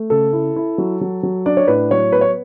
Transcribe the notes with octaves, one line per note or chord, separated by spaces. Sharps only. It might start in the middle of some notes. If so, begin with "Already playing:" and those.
Already playing: A3
C#3 A4
E4
E4
F#3
F#3
F#3
D4 D5
C#5
A2 B4
F#3 C#5
B3 B4
C#5